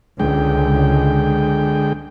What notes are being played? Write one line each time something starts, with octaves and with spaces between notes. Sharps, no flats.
C#2 D3 G#3 G5